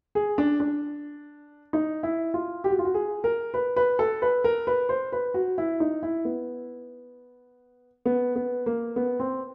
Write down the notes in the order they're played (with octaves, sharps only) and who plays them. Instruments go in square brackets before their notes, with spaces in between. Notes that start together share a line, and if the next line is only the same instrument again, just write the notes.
[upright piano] G#4
D4
D4
D#4
E4
F4
G4
F#4
F4
F#4
G#4
A#4
B4
B4
A4
B4
A#4
B4
C5
B4
F#4
E4
D#4
E4
B3
B3
B3
A#3
B3
C4